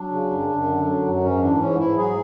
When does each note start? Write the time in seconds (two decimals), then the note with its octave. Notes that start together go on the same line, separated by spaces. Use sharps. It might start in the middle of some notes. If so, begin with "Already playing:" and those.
Already playing: F#3 D4
0.12 C#3
0.30 F#2
0.49 F#2
0.67 D3
0.86 F#3
1.05 F#2
1.22 G#2 C#4
1.41 E3 D4
1.60 G#2 C#4
1.79 G#2 E4
1.97 F#3 G#4